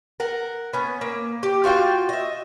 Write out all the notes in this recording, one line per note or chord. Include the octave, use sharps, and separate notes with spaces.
A#4 F#5
B3 C#4
A#3
G4
F4 F#4 F5 G5
D#5 E5